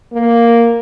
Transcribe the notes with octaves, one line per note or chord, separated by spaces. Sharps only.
A#3